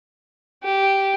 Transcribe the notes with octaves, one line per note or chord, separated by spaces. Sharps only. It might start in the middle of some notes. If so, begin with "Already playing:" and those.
G4